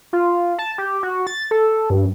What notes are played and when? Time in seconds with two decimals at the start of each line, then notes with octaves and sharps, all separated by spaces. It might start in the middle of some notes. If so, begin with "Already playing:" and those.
0.13 F4
0.59 A5
0.78 G4
1.03 F#4
1.27 A6
1.51 A4
1.90 G2